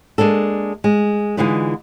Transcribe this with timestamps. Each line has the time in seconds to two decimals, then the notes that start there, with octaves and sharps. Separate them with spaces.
0.18 G#3 A#3 D4 A4
0.84 G#3
1.37 D3 E3 G#3 D#4 F4 B4